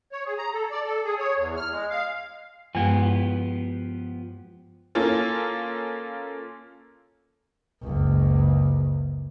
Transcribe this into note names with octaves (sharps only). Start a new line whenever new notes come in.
C#5
G#4
A#5
A4
D5
A4
G#4
C#5
E2
F6
G#3
F5
G2 F3 G#3 B3 G4
A#3 C#4 F4 A4
F#1 C#2